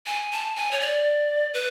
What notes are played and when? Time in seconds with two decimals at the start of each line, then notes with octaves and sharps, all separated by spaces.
0.06 G#5
0.32 A5
0.56 G#5
0.71 C#5
0.80 D5
1.54 B4